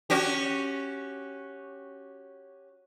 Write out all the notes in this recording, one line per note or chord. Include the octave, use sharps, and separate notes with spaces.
C#4 F#4 G4